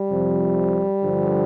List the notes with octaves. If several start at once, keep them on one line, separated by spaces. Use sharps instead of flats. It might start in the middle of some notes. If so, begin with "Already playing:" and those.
Already playing: G3
F2 C3 F3
G2 D3 F3